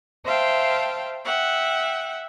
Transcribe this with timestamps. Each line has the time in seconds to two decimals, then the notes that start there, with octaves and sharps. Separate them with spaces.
0.25 C5 E5 F5 G5 A5
1.24 E5 F#5 G5